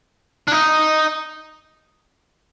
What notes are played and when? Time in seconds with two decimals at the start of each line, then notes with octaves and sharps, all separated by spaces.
0.48 D4
0.52 D#4